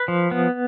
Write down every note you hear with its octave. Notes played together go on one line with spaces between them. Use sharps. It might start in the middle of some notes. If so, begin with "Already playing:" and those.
Already playing: B4
F3
B3